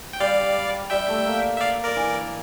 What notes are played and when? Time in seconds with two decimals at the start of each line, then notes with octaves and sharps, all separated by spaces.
0.13 G5
0.20 G3 D5 F5
0.90 G3 E5 G5
1.09 A3
1.25 A#3
1.56 E5
1.61 D5 F5
1.84 A#4 D5
1.96 E3